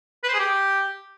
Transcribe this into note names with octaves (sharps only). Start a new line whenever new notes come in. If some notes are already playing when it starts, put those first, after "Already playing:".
B4
C5
G#4
G4